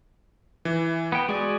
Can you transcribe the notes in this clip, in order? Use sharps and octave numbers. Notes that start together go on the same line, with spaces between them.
E3
B3 G5
G#3 F#4 G#4 D5